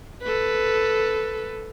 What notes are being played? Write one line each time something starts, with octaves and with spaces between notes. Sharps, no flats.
A4 B4